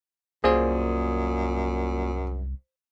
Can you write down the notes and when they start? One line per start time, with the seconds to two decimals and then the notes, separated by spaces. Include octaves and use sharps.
0.44 C2 F#2 A#3 F4 G#4 C5 D5